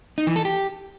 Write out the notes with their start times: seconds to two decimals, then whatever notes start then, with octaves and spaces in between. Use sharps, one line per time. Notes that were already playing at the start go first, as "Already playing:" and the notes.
0.18 D#4
0.27 E3
0.36 A4
0.45 G4